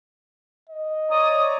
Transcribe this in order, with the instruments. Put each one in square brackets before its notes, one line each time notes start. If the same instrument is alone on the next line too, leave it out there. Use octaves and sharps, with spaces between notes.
[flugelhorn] D#5
[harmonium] C#5 D5 A#5 [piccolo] D#6